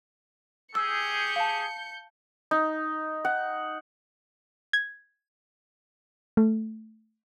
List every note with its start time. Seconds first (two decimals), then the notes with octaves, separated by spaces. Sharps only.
0.75 G4 G#4 E6 G6 C#7
1.36 F5 A5
2.51 D#4
3.25 F#5
4.73 G#6
6.37 A3